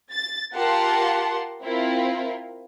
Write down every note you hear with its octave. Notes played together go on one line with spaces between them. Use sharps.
A6
F4 G4 A#4 F#5 A5 C6
C4 E4 F4 A#4